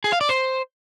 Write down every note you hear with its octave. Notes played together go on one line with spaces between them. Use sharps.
G#4
F5
D5
C5